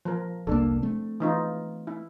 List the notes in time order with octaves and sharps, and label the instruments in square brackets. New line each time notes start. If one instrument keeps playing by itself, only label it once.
[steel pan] F3 A#4
[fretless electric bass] F1 C2 A#3 [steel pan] D4 A4
[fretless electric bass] A3 C4
[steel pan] E3 D#4 F4
E4